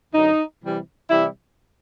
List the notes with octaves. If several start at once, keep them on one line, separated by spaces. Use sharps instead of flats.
F#2 D3 F#3 D#4
C3 E3 G3
C3 E3 G3 E4